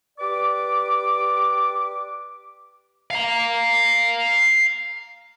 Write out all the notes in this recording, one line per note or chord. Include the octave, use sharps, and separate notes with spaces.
G4 B4 D5 D6
F5 A#5